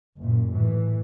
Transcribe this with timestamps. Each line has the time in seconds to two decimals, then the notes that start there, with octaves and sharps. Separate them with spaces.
0.17 F#1 A#2
0.53 A2 E3